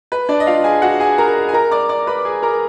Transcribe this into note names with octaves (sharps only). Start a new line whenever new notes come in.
B4
D4 D5
D#5
F4 F5
G#4 G#5
F#4 F#5
G#4 G#5
A#4 A#5
G#5
A#4 A#5
D5 D6
D5 D6
B4 B5
G#4 G#5
A#4 A#5